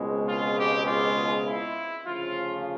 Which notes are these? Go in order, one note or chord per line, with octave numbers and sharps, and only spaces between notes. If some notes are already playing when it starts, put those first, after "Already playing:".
Already playing: C#2 B2 G#3 C4
F4
G4
F4
E4
D2 C#3 F3 F4